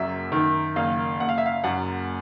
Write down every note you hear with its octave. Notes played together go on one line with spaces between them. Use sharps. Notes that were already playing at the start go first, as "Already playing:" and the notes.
Already playing: F#1 F#2 E5
D#3
F#1 F5
F#1 F#5
F5
E5
F5
F#2 F#5